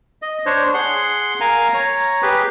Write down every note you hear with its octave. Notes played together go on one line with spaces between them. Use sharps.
D#5
D4 C5 C#5
G#4 F#5 C6
A#4 F5 G#5 A#5
C#5 A#5
G4 G#4 B4